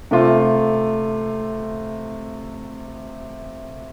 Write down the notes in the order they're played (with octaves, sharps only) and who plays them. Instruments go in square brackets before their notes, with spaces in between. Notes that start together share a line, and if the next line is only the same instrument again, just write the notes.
[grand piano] C3 A3 F4